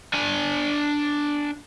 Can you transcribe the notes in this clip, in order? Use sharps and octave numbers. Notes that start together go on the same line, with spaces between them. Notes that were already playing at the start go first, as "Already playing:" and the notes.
D4 G#5